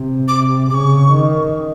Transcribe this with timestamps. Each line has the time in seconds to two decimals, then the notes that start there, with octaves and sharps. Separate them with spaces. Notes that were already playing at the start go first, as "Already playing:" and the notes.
Already playing: C3
0.28 D6
0.70 C#3 D6
0.74 C#6
1.11 D#3